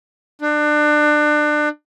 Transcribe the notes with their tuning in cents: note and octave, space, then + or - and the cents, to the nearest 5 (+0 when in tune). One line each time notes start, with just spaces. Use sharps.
D4 +30